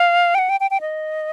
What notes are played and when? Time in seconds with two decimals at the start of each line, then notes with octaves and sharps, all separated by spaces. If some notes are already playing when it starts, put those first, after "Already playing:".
Already playing: F5
0.35 G5
0.39 F#5
0.49 G5
0.60 G5
0.71 G5
0.81 D#5